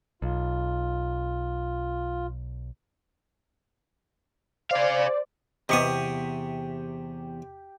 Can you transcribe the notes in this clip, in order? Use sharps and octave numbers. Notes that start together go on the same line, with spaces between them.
B1 F4
G#4 C5 D5 F5
E2 C3 B3 G4 D#5 C#6 D#6